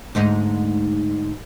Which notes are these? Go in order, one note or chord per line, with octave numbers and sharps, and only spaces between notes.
D2 G#2 D#4